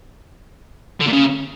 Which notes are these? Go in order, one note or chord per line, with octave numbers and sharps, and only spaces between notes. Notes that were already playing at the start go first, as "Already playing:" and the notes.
D3
A#2
C#3